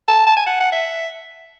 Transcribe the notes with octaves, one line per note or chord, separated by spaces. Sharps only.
A5
A5
G#5
F#5
F#5
E5